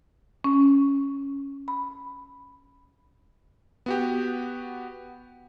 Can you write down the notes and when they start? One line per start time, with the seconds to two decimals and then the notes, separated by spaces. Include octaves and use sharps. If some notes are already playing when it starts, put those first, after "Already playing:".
0.44 C#4
1.68 B5
3.86 B3 F#4 G4